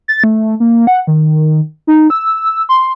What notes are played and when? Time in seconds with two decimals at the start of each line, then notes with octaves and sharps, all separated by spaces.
0.08 A6
0.24 A3
0.60 A#3
0.87 F#5
1.07 D#3
1.87 D#4
2.10 E6
2.69 C6